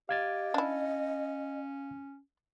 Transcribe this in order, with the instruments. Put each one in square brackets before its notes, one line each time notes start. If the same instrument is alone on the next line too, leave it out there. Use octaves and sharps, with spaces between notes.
[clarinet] G4 [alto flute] D#5 [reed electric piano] F5 G#6 A6
[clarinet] C#4 [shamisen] D4 E4